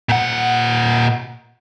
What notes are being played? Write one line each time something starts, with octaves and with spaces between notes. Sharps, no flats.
A#2 F#5